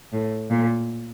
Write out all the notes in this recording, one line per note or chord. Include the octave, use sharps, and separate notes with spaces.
A2
A#2